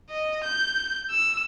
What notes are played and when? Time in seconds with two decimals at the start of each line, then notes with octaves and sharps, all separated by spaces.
0.10 D#5
0.44 G6
1.11 E6